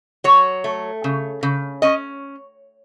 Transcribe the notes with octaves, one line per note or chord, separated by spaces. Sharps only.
F#3 C#5
A3
C#3
C#3
C#4 D#5